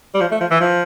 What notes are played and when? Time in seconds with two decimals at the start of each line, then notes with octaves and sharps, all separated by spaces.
0.15 G3
0.21 F3
0.31 A3
0.41 F3
0.51 E3
0.61 F3